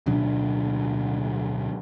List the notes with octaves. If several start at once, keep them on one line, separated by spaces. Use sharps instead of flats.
D1 B2 F#3 D4